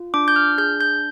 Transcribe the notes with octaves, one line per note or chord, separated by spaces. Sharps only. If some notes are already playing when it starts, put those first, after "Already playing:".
Already playing: F4
D4 D6
G6
F6
G#4 G6
G6